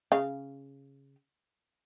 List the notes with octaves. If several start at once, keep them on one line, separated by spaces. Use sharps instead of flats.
C#3 F5